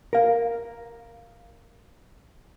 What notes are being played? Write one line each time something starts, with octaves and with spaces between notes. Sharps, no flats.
A#4 F5